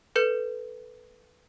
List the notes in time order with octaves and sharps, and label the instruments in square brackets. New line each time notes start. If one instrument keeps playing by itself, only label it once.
[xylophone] A4 B4 G6 C#7